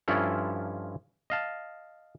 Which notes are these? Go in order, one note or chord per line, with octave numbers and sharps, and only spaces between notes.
G2 F3 C#4 E4 F4 A4
D#5 F5 A5